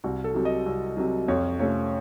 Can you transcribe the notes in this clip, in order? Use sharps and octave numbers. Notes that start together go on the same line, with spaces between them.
C2 F#4
A4
C3 F#3
D#5
C2
C3 F#3
F2 C#5
C3 F3 A3 C#4 C#5